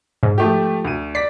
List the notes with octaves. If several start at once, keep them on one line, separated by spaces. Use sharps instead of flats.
G#2
F3 A3 G4
D2 D#7
D5 B6